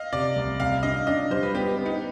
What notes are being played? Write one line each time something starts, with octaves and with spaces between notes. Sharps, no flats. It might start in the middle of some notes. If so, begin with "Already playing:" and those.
Already playing: D#5 F5
C3 D5
C2
C2 F5
D4 D#5
D4 D#5
G3 C5
B4
B3 G4
B3
D#4